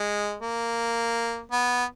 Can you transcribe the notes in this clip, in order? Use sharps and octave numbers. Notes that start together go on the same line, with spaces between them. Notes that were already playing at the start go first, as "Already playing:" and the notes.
Already playing: G#3
A#3
B3